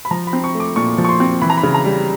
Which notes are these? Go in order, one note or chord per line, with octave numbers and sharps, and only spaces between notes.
B5
F3 A#5
B5
C4
C#6
A3
D6
A#2 C#6
F3
C#6
C6
C4
E3 B5
A#5
B5
C#3
A#5
G3